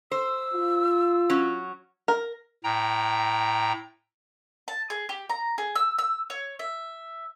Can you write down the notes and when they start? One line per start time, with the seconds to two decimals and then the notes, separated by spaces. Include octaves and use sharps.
0.11 C5 E6
0.54 F4
1.30 F#3 C#4
2.08 A#4
2.64 A2 G5 A#5
4.68 A5
4.90 G#4
5.09 G4
5.29 A#5
5.58 G#4
5.75 E6
5.98 E6
6.30 C#5
6.59 E5